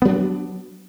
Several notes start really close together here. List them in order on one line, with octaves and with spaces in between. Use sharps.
B3 F#3 D4